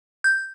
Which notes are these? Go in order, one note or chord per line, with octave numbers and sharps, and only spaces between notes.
G6